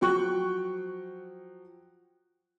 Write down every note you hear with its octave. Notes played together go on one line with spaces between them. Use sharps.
F3 F#3 G5 C#6 F#6